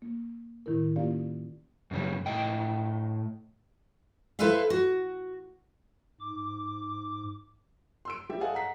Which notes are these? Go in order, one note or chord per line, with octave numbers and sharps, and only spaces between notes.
A#3
A2 D#3 E4 A#4
A#3 C#4 F4 G4 D5 F5
F#2 C#3 G3
A2 D#5 G5
E4 A4 B4 C5 E5 F5
F#4
G#2 D6
C6 E6 D7
G3 G4 E5
G#4 A4 D#5 F5 F#5 G#5
F#5 A#5 B6 C7